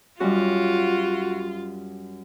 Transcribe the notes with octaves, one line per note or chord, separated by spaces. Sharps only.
F#2 G3 F4 F#4